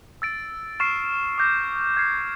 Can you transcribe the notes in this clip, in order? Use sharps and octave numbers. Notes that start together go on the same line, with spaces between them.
E6 A6 D7
C#6 F6 A6 C7 E7
D6 G6 A#6
F6 G#6 C7